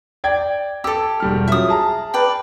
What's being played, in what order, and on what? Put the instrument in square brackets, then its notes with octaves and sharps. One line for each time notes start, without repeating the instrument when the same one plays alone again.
[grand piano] D5 G5 G#6
[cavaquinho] G4 A4 [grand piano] E6
[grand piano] E1 G3 F6
[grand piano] F#3 C#4 F4 [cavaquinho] E5 D#6
[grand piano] G#4 A5 A#5
[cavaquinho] B4 D5 G5